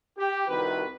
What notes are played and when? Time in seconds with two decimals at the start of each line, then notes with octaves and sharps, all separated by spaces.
0.17 G4
0.48 C2 C3 D#3 F#4 B4